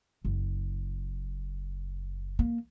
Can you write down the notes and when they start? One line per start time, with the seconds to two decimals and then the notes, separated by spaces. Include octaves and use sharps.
0.25 F#1
2.39 A#3